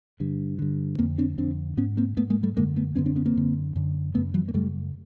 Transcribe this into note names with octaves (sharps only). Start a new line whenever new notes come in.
G2 D3
G2 D3
F2 D3 A#3 C4
C4 D4
F2 D3 C4 D4
G#2 B3 C#4
A#3 C4
G#2 A3 B3
G#3 A#3
G3 A3
F#2 D3 G#3 A#3
A3 B3
F#2 D3 B3 C#4
C4 D4
B3 C#4
A#3 C4
F#2 D3
F#2 D3
F#2 C#3 A3 B3
E3 F#3
A#3
F#2 C#3 G3 A3